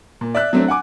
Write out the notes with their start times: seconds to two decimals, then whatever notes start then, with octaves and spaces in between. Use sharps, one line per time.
0.21 A#2
0.35 D5 E5 F#6
0.53 F#3 A3 C4 D4
0.68 F#5 G#5 D6